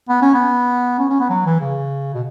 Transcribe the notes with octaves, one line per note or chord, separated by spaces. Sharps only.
B3
C#4
B3
C#4
C#4
B3
F#3
E3
C#3
B2